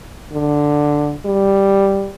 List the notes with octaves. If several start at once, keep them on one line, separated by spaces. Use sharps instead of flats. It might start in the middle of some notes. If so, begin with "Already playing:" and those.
D3
G3